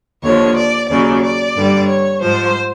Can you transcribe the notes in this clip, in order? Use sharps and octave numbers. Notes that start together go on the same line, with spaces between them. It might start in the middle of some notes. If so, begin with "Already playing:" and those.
D#2 D3 F3 C#5
D5
D#2 C#3 F#3 D5
D5
G2 D3 G3
C#5
G#2 F3 C5